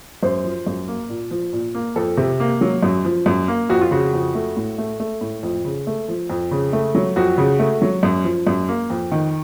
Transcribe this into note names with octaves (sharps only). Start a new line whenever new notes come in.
F#2 C5
F3
F#2
A#3
A#2
F3
A#2
A#3
F2 A4
C3
A#3
F#3
F#2
F3
F#2
A#3
F2 F#4
F4
C#3 F#4
F2
A3
A2
A3
A3
A2
F2
C#3
A3
F3
F2
C#3
A3
F#3
F2 F#4
C#3
A3
F#3
F#2
F3
F#2
A#3
F2
D#3